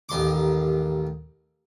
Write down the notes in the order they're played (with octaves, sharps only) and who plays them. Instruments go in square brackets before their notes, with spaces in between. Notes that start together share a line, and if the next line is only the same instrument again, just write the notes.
[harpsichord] A1 D#2 C6 D6